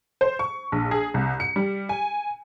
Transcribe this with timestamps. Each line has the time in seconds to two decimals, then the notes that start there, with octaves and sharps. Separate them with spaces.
0.21 C5
0.39 C#6
0.72 A#1
0.91 G#4
1.14 C2
1.40 C#7
1.56 G3
1.89 G#5